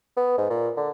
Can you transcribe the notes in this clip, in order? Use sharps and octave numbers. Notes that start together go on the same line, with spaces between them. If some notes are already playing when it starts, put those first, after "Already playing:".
B3
G#2
A#2
D3